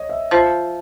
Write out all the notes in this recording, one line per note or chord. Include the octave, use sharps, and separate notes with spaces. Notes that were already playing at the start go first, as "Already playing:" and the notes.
Already playing: C#5 D#5
E5
F3 E5